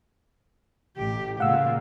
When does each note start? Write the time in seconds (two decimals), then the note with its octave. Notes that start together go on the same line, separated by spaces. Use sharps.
0.97 A1 G4
1.40 A#2 C#3 F5 F#5 E6